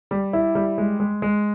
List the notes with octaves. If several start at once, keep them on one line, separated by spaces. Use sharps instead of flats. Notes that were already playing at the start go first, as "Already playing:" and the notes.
G3
E4
G3
G#3
G#3
G#3